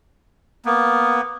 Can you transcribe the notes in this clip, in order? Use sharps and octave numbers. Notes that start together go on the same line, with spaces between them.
A#3 B3